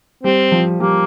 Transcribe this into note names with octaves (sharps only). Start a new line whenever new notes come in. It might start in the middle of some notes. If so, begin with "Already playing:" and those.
G3 C4
F3
G3 A#3